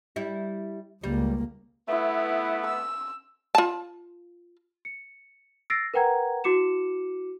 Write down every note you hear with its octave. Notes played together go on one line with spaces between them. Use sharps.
G3 E4
C#2 G3 A#3
A3 B3 E4
E6
F4 A5
C#7
E6 A6 A#6 C7 D7
A#4 B4 F#5 G5 A#5 G#6
E4 F#4 D6 C#7 E7